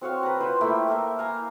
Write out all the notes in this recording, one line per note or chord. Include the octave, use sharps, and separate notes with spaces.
C4 F#4 C#5 F5
B4 A#5
F4 C5 B5
A3 A#3 E4 G5
A#3 A#4 E5
F5 G#5 A#5